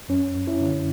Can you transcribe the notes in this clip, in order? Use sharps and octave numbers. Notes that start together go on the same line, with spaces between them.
F#2 C#4
F#2
C#4 E4
D3